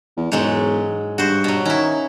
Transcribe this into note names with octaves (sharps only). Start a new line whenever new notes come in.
E2
E1 G#2 F#3 G#3
G2 F#4 C5
B2 F#3
D#3 C#4 E4